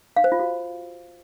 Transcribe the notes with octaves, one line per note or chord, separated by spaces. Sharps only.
F5
C5
F4
F#4